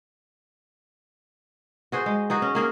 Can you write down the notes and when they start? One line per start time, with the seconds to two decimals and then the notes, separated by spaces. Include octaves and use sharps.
1.92 F#4 G#4 C5
2.06 G#3
2.30 D#4 F#4 G#4
2.42 C#4
2.55 A#3 G#4 A#4